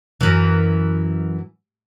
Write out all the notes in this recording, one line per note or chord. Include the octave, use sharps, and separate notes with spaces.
F#2 E3